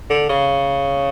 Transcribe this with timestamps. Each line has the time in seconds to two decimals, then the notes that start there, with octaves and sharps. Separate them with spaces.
0.10 D3
0.29 C#3